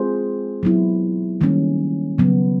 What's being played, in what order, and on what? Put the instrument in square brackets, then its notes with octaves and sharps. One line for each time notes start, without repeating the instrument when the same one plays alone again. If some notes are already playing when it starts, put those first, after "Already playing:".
Already playing: [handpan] G#3 C4 F4 G#4 C5
F#3 B3 E4
D#3 G3 A#3 C#4
C#3 F#3 B3